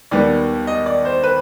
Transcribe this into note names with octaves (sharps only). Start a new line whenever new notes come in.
D#2 D#3 G3 B3 D5
D#5
D5
C5
B4